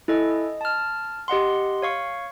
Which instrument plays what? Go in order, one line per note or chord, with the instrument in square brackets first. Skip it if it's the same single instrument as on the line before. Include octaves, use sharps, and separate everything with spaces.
[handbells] E4 A4 D#5 G#5
D#5
A5 F6
G4 D#5 F#5 C6
C#5 F5 C#6